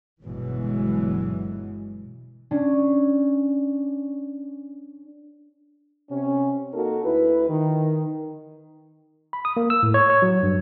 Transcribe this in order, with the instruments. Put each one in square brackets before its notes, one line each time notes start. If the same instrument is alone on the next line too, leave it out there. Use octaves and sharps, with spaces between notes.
[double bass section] G1 B2 E3 F#3 G#3
[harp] C#4 D4
[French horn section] C3 C#4
A#3 D#4 F#4 A4 A#4
D2 E4 B4
D#3
[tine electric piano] B5
D#6
A#3
E6
A2
C#5
C#5
F#3
G2